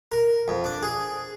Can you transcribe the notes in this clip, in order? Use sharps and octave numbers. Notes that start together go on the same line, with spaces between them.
A#4
F2
D4
G#4